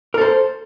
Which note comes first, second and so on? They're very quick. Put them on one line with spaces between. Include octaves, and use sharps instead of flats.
A#4 A4 C5